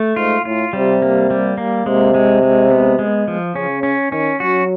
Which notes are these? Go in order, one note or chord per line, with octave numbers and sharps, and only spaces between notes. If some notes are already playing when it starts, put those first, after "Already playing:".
Already playing: A3
G#2 F4
A2 F4
C3 G3
A#3
G3
A#3
C3 G#3
G#3
G#3
B3
G#3
F3
C#3 C#4
C#4
D#3 C#4
F#3 F#4